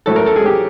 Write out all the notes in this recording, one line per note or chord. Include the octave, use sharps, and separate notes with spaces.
A2 F#3 A3 A4
A#4
A4
G#4
G4